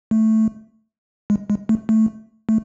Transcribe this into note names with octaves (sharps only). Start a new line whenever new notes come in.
A3
G#3
G#3
A3
A3
A3